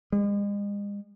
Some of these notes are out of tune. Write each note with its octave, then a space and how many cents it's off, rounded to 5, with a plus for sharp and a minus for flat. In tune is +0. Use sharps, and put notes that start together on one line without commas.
G#3 -40